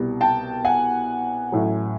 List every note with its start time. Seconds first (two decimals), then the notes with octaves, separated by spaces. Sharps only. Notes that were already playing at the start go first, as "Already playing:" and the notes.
Already playing: C2 B2 G3
0.21 G5 A5
0.65 F#5 G#5
1.52 A1 A2 F#3